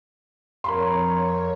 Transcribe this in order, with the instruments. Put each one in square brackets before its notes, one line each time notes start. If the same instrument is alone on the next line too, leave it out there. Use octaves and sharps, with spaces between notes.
[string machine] F2 C#5 [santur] A#4 F5 [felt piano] B5 C6